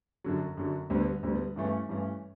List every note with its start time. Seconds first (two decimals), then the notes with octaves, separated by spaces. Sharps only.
0.24 F#2 D3 F#3
0.57 F#2 D3 F#3
0.90 D2 D3 G3 B3
1.23 D2 D3 G3 B3
1.56 G2 E3 A3 C#4
1.89 G2 E3 A3 C#4